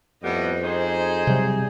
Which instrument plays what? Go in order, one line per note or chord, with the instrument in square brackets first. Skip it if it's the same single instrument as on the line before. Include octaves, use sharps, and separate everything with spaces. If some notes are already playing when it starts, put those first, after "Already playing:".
[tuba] F2 [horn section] A2 G3 B3 [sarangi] D#5
[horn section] D#4 C5 [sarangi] G#4
[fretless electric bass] C3 F#3 [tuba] G3